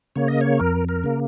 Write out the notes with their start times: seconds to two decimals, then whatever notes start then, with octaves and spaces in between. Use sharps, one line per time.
0.16 C#3 A#3 C#5
0.28 D#5
0.41 C#5
0.60 F2 A#4
0.89 A#4
1.04 C#3 A#3